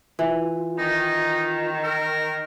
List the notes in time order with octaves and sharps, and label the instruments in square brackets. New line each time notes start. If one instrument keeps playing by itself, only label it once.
[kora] E3 [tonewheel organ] F4
[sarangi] D#3 [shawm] D#4
[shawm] A#4